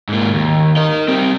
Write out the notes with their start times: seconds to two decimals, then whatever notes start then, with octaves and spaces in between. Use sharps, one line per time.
0.09 G#2 A#3
0.34 D#2
0.77 A#4 D#5
1.08 G3 C4